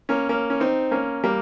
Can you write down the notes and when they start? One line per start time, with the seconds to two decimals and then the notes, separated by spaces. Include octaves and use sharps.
0.09 A#3 C#4
0.29 A#3 C#4
0.50 C#4
0.60 C4 D#4
0.91 A#3 C#4
1.24 G3 A#3